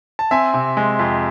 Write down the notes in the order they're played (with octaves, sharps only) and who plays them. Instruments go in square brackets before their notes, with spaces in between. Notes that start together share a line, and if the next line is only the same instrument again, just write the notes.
[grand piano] A5
C4 E5 G#5
C3
G#3
F2